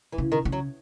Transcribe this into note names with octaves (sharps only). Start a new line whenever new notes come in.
E3
C#3
D#3
C#3
F#3